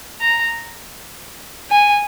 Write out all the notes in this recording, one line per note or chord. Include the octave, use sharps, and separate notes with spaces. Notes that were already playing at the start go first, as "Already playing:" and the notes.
A#5
G#5